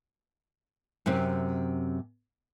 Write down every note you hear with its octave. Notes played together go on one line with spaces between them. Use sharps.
F#2 C3 C4